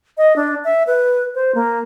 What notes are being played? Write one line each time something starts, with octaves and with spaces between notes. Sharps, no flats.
D#5
D4
E5
B4
C5
A#3